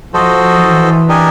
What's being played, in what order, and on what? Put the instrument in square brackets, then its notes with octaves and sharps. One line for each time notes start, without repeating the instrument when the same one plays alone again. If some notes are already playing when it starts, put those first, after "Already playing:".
[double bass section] F3 [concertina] F#4 A4 C5 D#5
[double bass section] E3
[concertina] D4 G4 A#4 D#5 G#5